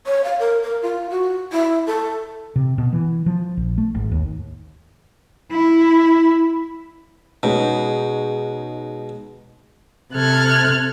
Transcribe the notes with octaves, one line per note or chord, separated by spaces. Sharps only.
C#5
F5
A#4
A#4
F4
F#4
E4
A4
C3
B2
E3
F3
A#1
A3
G#1
D#2
E4
B2 G#3 C#4 D#4
C3 A4 F6 F#6 G#6